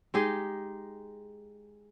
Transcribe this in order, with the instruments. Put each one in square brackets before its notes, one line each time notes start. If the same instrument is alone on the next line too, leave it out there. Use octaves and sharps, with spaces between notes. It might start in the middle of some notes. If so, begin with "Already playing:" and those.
[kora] G#3 D#4 G4 G#4